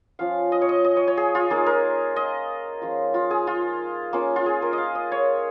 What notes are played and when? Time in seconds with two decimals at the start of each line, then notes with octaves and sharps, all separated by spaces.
0.19 F3 C#4 F4 F5
0.52 D#5
0.62 C#5
0.69 D#5
0.84 D#5
0.97 C#5
1.08 C#5
1.17 G#4
1.35 F4
1.50 A#3 D#4 G#4
1.66 A#4
2.16 D#5
2.81 F3 G#3 C#4 F4
3.14 F4
3.31 G#4
3.47 F4
4.13 A#3 C#4 F4
4.36 F4
4.46 G#4
4.62 A#4
4.73 D#5 F5
4.95 D#5
5.12 C#5